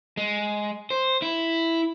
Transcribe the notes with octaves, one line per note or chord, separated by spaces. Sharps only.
G#3
C5
E4